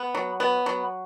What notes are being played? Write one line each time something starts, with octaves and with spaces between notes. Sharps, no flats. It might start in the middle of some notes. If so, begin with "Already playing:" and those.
Already playing: B3
F#3
B3
F#3